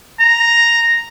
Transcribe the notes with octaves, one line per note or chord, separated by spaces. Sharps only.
A#5